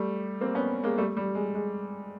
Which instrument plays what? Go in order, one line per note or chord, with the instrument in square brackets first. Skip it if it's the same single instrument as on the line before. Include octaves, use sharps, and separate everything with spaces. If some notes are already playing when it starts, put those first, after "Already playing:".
Already playing: [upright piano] G3 A3
A#3 C4
B3 C#4
G#3 A#3
G3 A3
G3
G#3
G#3